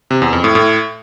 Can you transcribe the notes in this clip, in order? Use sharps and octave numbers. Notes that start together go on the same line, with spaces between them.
C3
E2
F2
A2
A2